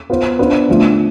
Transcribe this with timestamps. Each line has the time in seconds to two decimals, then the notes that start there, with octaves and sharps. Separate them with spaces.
0.10 B3 F4 C5
0.39 B3 D4 F4 C5
0.69 D3 F3 A3